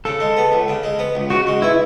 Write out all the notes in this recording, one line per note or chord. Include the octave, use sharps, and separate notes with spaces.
C#3 A4
G#3
B3
C#2
C#3
G#3
B3
C#2
C#3 F#4
G#3
B3 E4